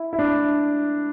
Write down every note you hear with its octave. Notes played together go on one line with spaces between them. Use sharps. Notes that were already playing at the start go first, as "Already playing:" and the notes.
Already playing: E4
E4
D4